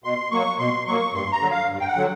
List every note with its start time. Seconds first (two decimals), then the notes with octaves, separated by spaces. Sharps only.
0.04 B2 C6
0.31 F#3 A#3 C#6
0.59 B2 C6
0.87 F#3 A#3 C#6
1.14 G2 C6
1.32 A#5
1.41 D3 F#3
1.51 F5
1.69 G2
1.80 G5
1.87 F#5
1.96 D3 F#3